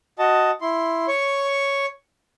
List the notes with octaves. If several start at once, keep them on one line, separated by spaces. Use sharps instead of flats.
F#4 D#5 A5
E4 C6
C#5 C#6